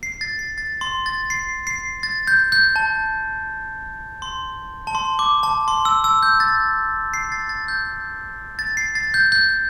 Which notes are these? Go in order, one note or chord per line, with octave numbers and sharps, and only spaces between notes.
C7
A6
C7
A6
C6
A6
C7
C7
A6
G6
G6
A5
C6
A5
C6
D6
A5
C6
E6
E6
G6
A6
C7
A6
A6
G6
A6
C7
A6
G6
G6